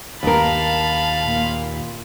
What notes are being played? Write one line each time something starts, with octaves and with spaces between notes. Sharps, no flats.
D#2 A#4 F5 A5 B5
A#2